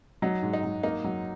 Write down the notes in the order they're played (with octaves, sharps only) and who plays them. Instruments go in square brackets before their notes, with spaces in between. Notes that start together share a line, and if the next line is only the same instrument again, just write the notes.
[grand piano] F#3 [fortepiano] D#4
[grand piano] G#2
[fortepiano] D#4
[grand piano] F#3
[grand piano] A#3 [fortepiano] D#4
[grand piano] F#3